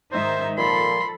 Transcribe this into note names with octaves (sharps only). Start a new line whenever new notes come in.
G#2 D#3 D#4 C5 E5
A#2 F3 A4 B5 C6